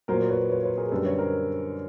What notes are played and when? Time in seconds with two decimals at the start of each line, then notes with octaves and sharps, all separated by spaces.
0.08 F#3 A#4 C5
0.12 A#2
0.29 B4 C#5
0.50 B4 C#5
0.63 B4 C#5
0.77 G#4 A#4
0.92 F#2 D3 G3 A4 B4
1.04 B4 C#5
1.18 A#4 C5